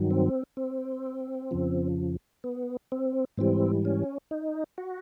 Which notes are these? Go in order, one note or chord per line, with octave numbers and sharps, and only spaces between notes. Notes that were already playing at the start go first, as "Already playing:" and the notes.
Already playing: G2 D#3 F#3
C4
C4
F2 C#3 F3
B3
C4
G#2 E3 G3 C4
C#4
D#4
F#4